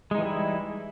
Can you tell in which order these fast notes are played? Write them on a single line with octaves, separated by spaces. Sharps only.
G#3 D#4 E3 G3 E4